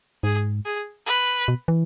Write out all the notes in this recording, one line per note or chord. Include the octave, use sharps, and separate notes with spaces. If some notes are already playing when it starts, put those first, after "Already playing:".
G#2 G#4
G#4
B4
B2
E3